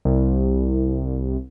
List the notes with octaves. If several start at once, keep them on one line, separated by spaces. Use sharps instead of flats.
C2